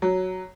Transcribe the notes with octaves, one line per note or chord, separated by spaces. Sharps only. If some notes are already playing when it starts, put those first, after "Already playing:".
F#3